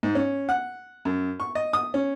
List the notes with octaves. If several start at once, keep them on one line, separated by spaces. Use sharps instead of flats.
G#2
C#4
F#5
F#2
C#6
D#5
D#6
C#4